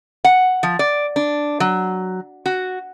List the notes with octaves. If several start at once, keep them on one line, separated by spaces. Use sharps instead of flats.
F#5
F3
D5
D4
F#3
F#4